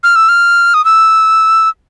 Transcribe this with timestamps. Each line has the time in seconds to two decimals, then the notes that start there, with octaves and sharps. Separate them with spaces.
0.03 F6
0.16 E6
0.29 F6
0.74 D#6
0.85 E6